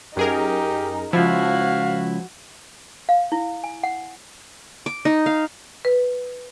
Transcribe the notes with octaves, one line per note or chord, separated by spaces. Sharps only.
F#2 D#4 G4 G#4 A#4
C#2 F3 E4 F#4 F5
F5
E4
G#5
F#5
D6
D#4
F5
B4